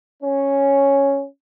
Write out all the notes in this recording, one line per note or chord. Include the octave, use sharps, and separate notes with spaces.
C#4